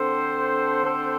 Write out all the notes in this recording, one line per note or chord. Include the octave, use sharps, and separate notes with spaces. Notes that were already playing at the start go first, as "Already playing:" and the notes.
Already playing: D3 C4 A4 C5
D3 C4 A4 C5